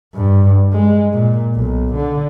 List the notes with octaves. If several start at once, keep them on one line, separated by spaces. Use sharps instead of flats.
G2
G#3
A#2
B1
D3